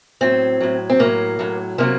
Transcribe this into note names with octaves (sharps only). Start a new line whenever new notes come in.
A2 F#3 C4
A2 F#3
C4
A2 F#3 A#3
A2 F#3
C3 D#3 F#3 A#3